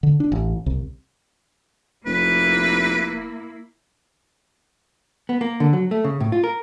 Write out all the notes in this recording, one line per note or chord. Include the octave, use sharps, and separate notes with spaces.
D3
D4
A1
C2
F1 A#3 E4 B4
B3
A#3
D3
F#3
A3
C#3
A2
F4
A#4